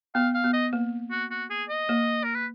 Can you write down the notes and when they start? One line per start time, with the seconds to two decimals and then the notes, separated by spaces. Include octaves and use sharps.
0.15 B3 F5
0.35 F5
0.44 B3
0.53 D#5
0.73 A#3
1.11 F#4
1.31 F#4
1.50 G#4
1.69 D#5
1.89 A#3
2.24 A#4
2.35 B4